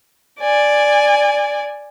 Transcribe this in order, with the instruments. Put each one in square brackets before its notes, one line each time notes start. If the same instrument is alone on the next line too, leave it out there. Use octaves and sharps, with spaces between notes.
[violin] D5 G#5